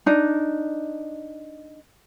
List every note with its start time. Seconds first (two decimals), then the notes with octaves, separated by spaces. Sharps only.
0.06 D4 D#4